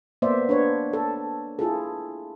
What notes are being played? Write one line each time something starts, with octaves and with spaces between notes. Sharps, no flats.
A#3 B3 C5 D5 E5
D4 B4 C#5
A4
E4 F4 G#4 A4